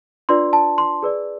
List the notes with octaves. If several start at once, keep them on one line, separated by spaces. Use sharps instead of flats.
D4 F4 B4 D5 C6
A5
C6
G#4 B4 D5